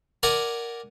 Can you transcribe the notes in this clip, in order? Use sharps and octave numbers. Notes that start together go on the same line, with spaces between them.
A#4 D5 F#5 G#5